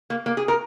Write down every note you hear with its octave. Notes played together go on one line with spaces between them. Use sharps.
A#3
A#3
G#4
A#4